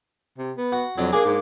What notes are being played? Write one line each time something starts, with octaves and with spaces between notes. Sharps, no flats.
C3
B3
F#4
F2 F#3 D4
A#3 D4 G#4
G#2